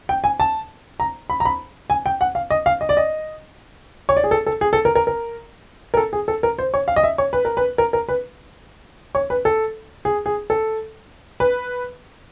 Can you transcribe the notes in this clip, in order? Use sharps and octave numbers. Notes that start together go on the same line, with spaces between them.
G5
G#5
A5
A#5
B5
A#5
B5
G#5
G5
F#5
F5
D#5
F5
D#5
D5
D#5
C#5
D5
G#4
A4
A4
G#4
A4
A#4
A#4
A#4
A#4
A4
G#4
A4
A#4
C5
C#5
F5
D#5
E5
C#5
B4
A#4
B4
A#4
A#4
B4
C#5
B4
A4
G#4
G#4
A4
B4